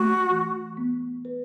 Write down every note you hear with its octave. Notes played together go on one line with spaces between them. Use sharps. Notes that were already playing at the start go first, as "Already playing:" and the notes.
Already playing: A3 F#4
E3
B3
B4